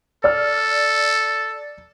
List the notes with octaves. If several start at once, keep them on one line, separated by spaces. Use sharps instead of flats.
A4 D5 F6